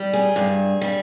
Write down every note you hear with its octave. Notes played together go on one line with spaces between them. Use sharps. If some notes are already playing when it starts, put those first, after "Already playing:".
Already playing: G3
G#4
G2
G3